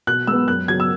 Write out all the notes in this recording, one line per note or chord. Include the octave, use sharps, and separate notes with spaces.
B2 F#6
G#3 B3 E6
F#2 F#6
C#3 F#3 B3 G#6
E6